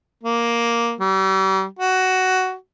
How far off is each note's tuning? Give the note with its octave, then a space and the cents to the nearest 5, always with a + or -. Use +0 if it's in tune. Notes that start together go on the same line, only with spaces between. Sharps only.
A#3 +5
G3 -40
F#4 +10